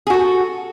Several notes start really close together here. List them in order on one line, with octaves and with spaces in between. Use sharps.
G#4 F#4 A4